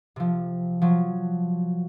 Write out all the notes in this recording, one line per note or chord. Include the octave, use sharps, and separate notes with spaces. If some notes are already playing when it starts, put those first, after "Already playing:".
C3 F3
F3 F#3